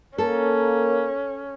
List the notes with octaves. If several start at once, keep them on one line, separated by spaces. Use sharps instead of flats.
A#3 C#4 A4 A#4